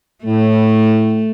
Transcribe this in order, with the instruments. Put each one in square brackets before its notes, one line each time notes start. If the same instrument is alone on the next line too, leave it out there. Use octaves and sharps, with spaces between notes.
[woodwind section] A2 [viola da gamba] A3